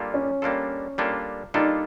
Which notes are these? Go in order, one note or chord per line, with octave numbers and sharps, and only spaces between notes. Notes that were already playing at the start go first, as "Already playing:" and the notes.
Already playing: G3 A#3 D4 F4 A4
C#4
G3 A#3 D4 F4 A4
G3 A#3 D4 F4 A4
G3 A#3 D4 D#4 F4 A4